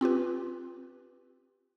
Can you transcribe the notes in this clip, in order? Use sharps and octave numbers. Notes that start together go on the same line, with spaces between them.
C4 F4 G4 B4